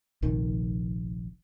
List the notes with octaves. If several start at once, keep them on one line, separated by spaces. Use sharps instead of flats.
F1 A#1 F2 D#3